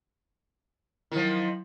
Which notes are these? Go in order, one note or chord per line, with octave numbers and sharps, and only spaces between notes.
D#3 F3 F#3 E4